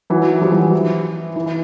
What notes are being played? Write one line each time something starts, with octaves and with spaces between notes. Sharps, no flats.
E3 F#3
F3 G3
E3 F#3
E3
E3
E3